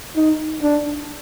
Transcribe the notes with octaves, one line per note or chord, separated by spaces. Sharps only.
D#4
D4